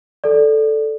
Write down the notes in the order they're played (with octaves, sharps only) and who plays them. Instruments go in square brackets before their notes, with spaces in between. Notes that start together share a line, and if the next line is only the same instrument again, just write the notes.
[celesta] A4 D5